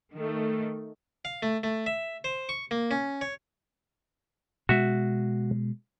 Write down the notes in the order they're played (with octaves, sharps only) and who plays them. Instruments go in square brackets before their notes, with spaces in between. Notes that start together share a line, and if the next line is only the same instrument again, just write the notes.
[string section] D#3 A3
[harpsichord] F5
A3
A3
E5
C5
C#6
A#3
C#4
C#5
[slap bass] B2 G#3 [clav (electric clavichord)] F#4 E5